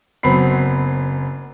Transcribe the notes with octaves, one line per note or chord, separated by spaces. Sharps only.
F#1 F#3 B3 C4 B5 C7